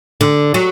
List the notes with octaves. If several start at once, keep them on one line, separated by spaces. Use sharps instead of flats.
D3
F#3